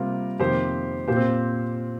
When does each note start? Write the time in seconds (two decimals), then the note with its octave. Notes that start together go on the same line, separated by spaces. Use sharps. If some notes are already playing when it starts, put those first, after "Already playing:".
Already playing: C3 G3 A#3 F4 A#4
0.40 F2 C3 D#3 A#3 G4 C5
1.08 A#2 A#3 G4 C5
1.16 C4